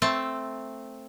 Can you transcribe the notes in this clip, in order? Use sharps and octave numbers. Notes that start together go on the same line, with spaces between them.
A3 C4 A5